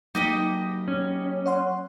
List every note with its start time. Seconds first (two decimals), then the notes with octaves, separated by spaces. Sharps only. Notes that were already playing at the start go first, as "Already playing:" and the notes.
0.15 F#3 A#3 D#4 G4 D#5 D6 D#6 A#6
0.88 C#4
1.46 C#5 F#5 C6